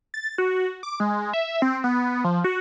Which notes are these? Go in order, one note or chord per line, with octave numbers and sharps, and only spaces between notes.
A6
F#4
D6
G#3
E5
C4
B3
F3
F#4